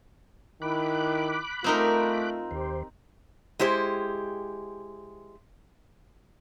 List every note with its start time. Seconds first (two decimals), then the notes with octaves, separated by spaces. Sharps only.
0.62 D#3 E4 B5 D6 F#6
1.64 A3 C4 D#4 F4 A#4
2.51 D#2 G4 C5
3.59 G#3 E4 G4 C5